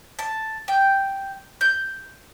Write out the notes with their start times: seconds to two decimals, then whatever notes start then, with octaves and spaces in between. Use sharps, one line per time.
0.19 A5
0.68 G5
1.61 G6